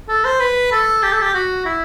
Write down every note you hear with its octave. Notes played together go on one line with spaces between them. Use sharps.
A4
C5
B4
A4
G4
A4
G4
F#4
E4